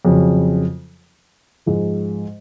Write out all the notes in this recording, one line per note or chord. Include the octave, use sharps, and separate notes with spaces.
F2 C#3 F#3
G#2 F3 G#3